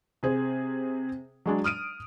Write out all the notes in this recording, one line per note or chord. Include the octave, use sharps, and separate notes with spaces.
C3 G#4 C5
F#3 G#3 D4
D#6 F6 D7 D#7